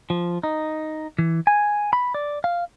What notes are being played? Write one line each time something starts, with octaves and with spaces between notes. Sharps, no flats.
F3
D#4
E3
G#5
B5
D5
F5